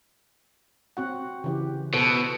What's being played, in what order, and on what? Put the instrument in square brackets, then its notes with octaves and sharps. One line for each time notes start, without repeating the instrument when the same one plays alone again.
[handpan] C4 F#4 F#5
C#3 E3 G4
[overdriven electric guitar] B2 [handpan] A4 B4 C5